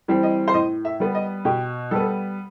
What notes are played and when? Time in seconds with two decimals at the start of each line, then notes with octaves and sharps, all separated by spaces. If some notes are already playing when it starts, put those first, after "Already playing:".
0.08 E3 G3 C4
0.23 D#5
0.48 C5
0.54 A2 D#5
0.85 E5
1.00 G3 B3
1.15 D#5
1.45 B2 G4
1.91 G3 B3 A4